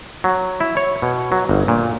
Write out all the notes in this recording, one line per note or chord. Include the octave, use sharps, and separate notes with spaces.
F#3
E4
C#5
B2
F#3
G1
A#2